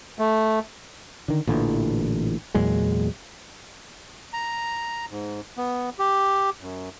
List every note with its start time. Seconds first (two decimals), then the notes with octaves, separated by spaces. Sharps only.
0.19 A3
1.28 D3 D#3
1.47 A1 A#2 D3 E3
2.55 E2 A#2 F#3 G#3
4.33 A#5
5.11 G#2
5.57 B3
5.99 G4
6.61 F#2